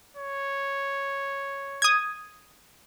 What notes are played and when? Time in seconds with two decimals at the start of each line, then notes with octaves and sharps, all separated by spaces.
0.17 C#5
1.82 D#6 G#6